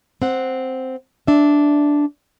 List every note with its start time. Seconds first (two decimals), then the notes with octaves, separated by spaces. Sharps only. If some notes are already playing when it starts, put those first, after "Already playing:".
0.22 C4 F#5
1.27 D4 E5